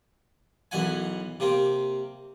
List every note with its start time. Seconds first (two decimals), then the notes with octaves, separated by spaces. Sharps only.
0.71 B1 F#2 E3 F#5 G#5
1.40 C3 A#3 C4